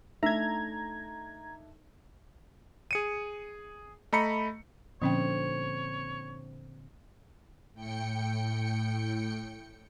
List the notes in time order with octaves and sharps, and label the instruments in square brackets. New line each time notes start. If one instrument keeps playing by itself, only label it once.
[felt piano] A3 D4 D#4 [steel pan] E5 [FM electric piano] A#5 G#6
[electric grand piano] G#4 C#7 D#7
A3 D#5 A#5 B5 C#7
[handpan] A#2 D3 [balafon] F3 C#4 G5 [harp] C4 [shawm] C#5
[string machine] A2 G5 C#7